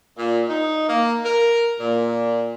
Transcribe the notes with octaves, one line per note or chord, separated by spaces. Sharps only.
A#2
D#4
A#3
A#4
A#2